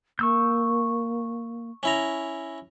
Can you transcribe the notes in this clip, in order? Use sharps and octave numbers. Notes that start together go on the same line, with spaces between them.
A#3 C#6 E6 G6
C#4 E4 A#5